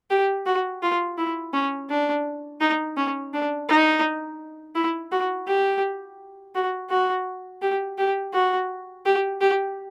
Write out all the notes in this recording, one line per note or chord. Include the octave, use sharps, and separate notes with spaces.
G4
F#4
F4
E4
C#4
D4
D#4
C#4
D4
D#4
E4
F#4
G4
F#4
F#4
G4
G4
F#4
G4
G4